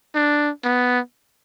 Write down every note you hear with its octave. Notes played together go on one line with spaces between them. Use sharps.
D4
B3